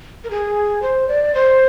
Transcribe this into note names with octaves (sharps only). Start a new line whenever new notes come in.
A#4
G#4
C5
D5
C5